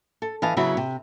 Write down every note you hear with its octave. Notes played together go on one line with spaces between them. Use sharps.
A4
E3 D#5 F5 A5
C#3 F#3 B3 E4 F#4
C3